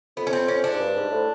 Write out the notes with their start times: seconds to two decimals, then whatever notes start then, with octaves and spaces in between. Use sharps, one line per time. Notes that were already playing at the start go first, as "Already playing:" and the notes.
0.17 F2 B3
0.27 C#4
0.33 C4
0.48 C#4
0.64 D4
0.72 G#2
0.79 G2
0.96 G#2
1.11 A2